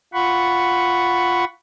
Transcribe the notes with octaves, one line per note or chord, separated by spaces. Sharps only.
F4 F#5 B5 C#6